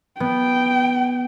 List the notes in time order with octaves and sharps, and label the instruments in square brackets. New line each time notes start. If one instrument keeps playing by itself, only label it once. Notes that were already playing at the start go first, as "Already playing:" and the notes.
[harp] B3 [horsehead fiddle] G5